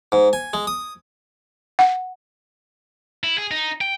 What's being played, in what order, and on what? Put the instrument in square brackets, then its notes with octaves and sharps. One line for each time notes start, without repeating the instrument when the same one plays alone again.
[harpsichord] G#2
G#5
G#3
D#6
[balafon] F#5
[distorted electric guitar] E4
G#4
D#4
G5